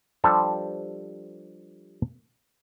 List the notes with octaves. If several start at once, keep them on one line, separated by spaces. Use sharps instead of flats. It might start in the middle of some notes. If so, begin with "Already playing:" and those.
F3 G3 D4 G4 A4 C5